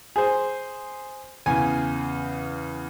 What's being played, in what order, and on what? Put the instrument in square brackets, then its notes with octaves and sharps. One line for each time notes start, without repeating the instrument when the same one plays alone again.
[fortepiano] G#4 C5
[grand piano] E2 C#3 [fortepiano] G#5